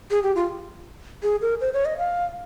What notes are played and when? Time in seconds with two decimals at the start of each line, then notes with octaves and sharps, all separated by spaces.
0.11 G#4
0.23 G4
0.36 F4
1.23 G#4
1.41 A#4
1.61 C5
1.74 C#5
1.85 D#5
1.98 F5